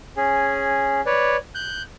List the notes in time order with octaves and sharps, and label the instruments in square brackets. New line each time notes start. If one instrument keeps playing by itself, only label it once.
[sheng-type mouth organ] C#4 G#4
B4 C#5 D5
F#6 G6